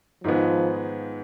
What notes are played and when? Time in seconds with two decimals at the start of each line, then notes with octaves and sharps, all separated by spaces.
0.24 G#2 D#3 F3 G#3 B3